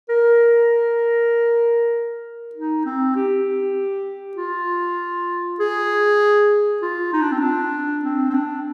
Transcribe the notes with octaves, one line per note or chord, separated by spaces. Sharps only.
A#4
D#4
C4
G4
F4
G#4
F4
D#4
D4
C4
D4
C4
C4
D4